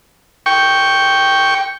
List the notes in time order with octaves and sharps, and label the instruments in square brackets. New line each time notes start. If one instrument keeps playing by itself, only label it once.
[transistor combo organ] G5 C#6